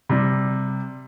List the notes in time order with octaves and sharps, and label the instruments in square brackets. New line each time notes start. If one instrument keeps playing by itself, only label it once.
[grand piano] C3 G3